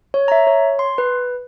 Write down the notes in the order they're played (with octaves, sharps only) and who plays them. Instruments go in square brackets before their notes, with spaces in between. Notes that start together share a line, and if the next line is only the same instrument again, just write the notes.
[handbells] C#5
E5 A#5
C#5
C6
B4